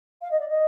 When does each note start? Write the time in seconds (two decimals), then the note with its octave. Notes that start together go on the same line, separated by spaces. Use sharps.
0.21 F5
0.31 D#5
0.40 D5
0.49 D#5